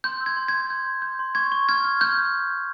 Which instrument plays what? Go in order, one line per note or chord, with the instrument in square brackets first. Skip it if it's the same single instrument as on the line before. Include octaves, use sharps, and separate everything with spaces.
[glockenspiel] C6 G6
E6
G#6
C6
G#6
C6
G6
C6
G6
C6
C#6 G#6
C#6
F6 G#6
F6
F6 G6